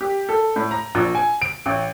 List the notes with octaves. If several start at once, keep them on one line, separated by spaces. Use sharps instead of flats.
G4
A4
A2
A#5
A#1
G#5
D7
A1